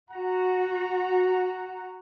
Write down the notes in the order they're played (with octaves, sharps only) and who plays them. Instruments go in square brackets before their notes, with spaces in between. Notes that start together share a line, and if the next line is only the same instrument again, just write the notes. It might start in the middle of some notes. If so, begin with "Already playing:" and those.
[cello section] F#4 [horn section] F#5 A#5